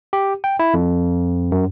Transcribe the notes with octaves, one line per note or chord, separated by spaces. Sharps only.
G4
G5
E4
F2
F#2